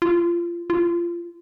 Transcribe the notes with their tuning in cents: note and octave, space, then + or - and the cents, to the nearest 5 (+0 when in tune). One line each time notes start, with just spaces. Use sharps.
F4 -25
F4 -25